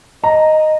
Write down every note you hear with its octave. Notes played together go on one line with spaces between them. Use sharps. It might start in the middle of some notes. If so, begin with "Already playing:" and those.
D#5 A#5